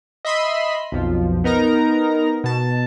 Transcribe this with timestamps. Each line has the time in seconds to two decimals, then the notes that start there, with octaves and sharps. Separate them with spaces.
0.25 D#5 E5 B5 C6
0.92 B1 F2 F3
1.44 B3 D#4 A#4 A#5
2.44 B2 A5